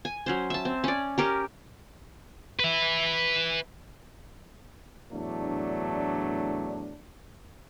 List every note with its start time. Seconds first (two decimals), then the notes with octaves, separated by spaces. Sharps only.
0.05 G#5
0.26 F#3 C#4 C5
0.50 E5 A5
0.65 C4
0.84 C#4 D5
1.18 C#4 G4 A#4
2.60 B4 E5
5.13 E2 A2 F#3 A3 D4